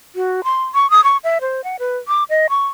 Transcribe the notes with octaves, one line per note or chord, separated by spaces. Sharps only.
F#4
C6
C#6
D#6
C#6
E5
C5
F#5
B4
D6
D#5
C#6